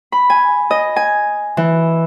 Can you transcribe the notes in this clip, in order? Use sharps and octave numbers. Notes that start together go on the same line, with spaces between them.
B5
G#5
D#5
G#5
E3